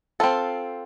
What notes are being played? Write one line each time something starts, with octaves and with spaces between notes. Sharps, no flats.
C4 F4 A4